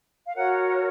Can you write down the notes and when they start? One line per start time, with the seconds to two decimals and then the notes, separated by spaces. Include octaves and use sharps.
0.27 F5
0.35 F#4 A#4 C#5 F#5